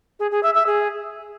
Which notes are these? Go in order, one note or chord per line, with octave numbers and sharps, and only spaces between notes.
G#4
G#4
E5
E5
G#4